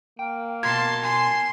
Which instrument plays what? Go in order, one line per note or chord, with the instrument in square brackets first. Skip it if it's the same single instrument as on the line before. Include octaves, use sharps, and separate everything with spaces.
[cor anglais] A#3 [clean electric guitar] G5
[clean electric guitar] B2 A#4 A#5 [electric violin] A5 C6 [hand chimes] G#6
[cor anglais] G#5 [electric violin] C6